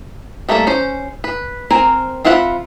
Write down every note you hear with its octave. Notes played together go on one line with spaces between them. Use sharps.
G3 A3 A#3 A4 E5
C#4 C5
B4
C4 A#4 G#5
C4 F4 E5 F#5 B5